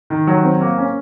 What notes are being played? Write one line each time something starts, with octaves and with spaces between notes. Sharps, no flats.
D#3
F#3
C4
A#3
C#4